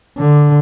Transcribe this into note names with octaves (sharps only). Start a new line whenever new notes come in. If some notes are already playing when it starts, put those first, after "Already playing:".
D3